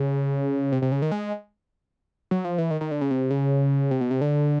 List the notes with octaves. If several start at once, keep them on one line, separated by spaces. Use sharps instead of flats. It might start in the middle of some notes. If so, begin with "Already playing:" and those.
Already playing: C#3
C3
C3
C#3
D#3
G#3
F#3
F3
E3
D#3
D#3
D3
C#3
C3
C#3
C3
B2
C3
D3